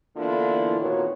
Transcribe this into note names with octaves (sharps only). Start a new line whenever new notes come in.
D3 E3 A#3 B3 E4 F4
F2 A#2 D#3 F#4 B4 C#5